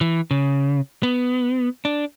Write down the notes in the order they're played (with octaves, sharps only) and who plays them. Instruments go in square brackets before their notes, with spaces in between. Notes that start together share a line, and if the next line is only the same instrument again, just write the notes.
[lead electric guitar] E3
C#3
B3
D4